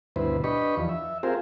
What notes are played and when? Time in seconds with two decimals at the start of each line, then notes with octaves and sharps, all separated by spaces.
0.16 D2 G2 B2 E4 B4 C5
0.44 D4 G4 B4 D#5 B5 C#6
0.77 E2 F3
0.89 E5
1.23 C4 F4 G4 G#4 A#4 C5